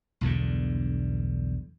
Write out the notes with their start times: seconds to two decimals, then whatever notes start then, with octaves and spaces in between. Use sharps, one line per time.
0.21 B1 E2 G2 D3